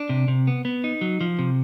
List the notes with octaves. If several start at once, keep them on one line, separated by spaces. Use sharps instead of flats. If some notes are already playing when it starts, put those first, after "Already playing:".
Already playing: D4
C3
C3
B3
B3
D#4
F#3
F3
C3